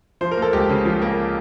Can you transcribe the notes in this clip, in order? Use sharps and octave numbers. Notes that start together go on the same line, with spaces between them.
F3 C5
A#4
A#3
A4
C#2 G4
C#3
F3
A#3